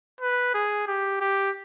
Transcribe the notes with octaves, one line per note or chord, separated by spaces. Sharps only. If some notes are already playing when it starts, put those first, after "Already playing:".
B4
G#4
G4
G4